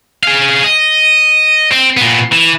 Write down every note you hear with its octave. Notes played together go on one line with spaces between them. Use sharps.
G#4 F5
D#5
C4
A#2 B3
E3